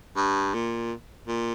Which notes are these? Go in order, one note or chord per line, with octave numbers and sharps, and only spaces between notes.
G2
A#2
A#2